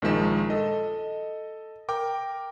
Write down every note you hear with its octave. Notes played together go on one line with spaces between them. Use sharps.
A#1 D#3 F3 G#3 E7
A4 D#5
A#4 G5 D6